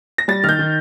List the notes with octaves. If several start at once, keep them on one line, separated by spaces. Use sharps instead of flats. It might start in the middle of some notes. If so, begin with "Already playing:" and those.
A#6
G3 A6
D#3 F6
G6
D#3